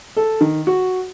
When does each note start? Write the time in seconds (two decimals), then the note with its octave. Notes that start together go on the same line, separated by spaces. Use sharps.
0.17 A4
0.41 D#3
0.67 F#4